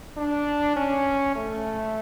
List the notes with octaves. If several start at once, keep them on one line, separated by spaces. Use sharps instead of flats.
D4
C#4
A3